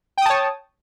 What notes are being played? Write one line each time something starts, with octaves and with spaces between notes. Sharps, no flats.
C#5 G5 A5 D#6